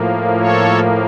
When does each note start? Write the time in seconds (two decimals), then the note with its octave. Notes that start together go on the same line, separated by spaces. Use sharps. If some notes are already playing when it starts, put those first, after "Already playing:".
Already playing: A2 F3 A#3
0.38 A4 C#5